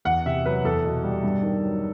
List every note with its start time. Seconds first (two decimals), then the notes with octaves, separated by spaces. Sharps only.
0.05 E2 F#5
0.26 C3 E5
0.45 F#3 B4
0.64 E2 A4
0.84 B2
1.03 G3
1.23 G2
1.43 D#3
1.63 F#3